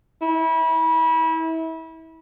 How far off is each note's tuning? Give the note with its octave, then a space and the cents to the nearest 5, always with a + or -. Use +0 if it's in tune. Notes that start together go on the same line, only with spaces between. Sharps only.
E4 -30